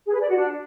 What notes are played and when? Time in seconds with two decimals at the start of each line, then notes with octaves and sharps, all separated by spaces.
0.05 G#4
0.12 B4
0.20 D5
0.28 F#4
0.35 D4